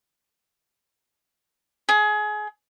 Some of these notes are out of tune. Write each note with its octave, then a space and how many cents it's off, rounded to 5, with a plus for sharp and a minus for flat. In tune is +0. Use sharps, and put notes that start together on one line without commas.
G#4 +25